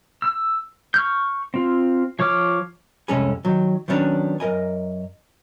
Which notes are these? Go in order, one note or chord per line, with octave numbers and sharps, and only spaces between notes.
E6
C#6 F6 G6
C4 F4
F3 C#5 C#6 D6 F6
C2 F2 G#3 C#4 A4 G#5
D#3 F#3
D#3 F#3 B3 C#4 D4
F#2 A#4 D#5 G#5